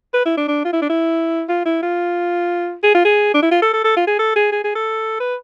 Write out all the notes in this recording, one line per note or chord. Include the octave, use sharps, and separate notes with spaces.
B4
E4
D4
D4
F4
E4
D4
E4
F4
E4
F4
G#4
F4
G#4
D4
E4
F4
A4
A4
A4
F4
G#4
A4
G#4
G#4
G#4
A4
B4